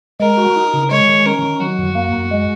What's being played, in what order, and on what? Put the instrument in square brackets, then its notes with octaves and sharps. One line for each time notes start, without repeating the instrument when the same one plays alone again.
[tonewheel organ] G#3 [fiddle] A#4
[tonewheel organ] F#4
D#4
C#3
[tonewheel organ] G#3 [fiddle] C#5
[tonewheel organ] D#3
[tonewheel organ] C#4 [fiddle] A#4
[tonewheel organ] D#3
[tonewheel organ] F#3 [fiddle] F#4
[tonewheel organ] F#2
A#3
F#2
G#3